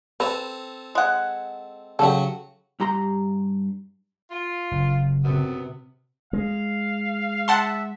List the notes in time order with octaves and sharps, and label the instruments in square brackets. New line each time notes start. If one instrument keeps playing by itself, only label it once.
[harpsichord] C4 A4 A#5 [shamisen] B4
[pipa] G#3 F#5
[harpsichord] C#3 F#3 F#4 [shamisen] G4 A4
[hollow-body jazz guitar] G2 G4 A#5 C6
[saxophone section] F4
[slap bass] F#1
[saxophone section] F#2 B3 [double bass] C3
[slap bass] G#3 [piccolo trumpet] F5
[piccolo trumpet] E5 [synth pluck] F#5 A5 C6